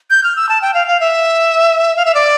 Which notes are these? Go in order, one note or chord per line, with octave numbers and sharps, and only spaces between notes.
G6
F6
E6
A5
G5
F5
F5
E5
F5
E5
D5